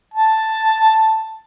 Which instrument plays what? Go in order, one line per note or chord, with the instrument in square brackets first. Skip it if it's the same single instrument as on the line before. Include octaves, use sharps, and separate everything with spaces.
[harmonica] A5